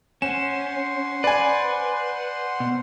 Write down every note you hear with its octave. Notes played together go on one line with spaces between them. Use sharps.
C#4 C5 F#5 C6 E7
B4 D5 G#5
B2